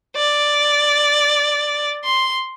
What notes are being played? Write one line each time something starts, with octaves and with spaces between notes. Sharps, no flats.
D5
C6